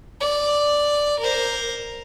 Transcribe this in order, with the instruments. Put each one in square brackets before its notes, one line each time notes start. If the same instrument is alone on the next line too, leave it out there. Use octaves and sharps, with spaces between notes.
[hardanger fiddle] D5
A#4 C5